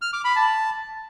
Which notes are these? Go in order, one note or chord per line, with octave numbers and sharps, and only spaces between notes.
F6
D6
B5
A5